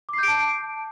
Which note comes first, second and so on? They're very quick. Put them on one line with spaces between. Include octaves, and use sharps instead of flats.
D6 C7 G6 D7 A5